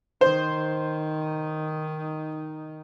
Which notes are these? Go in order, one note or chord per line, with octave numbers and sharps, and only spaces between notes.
D#3 D#4 C5